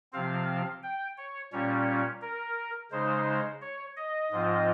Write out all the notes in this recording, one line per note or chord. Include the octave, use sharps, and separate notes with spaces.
C3 F3 C4 F5
G5
C#5
A#2 G3 C#4 C#5
A#4
C#3 G#3 D#4 C5
C#5
D#5
G#2 F3 C4 F4